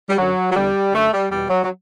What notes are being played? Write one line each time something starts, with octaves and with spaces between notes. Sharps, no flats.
G3
F#2 D3 F#3
F#3
E2 D3 G3
F#2 D3 A3
G3
E2 B2 G3
F#3
F#3